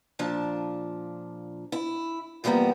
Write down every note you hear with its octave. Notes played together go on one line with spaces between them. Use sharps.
A#2 F3 D4 A5
E4
E3 F3 G3 A#3 B3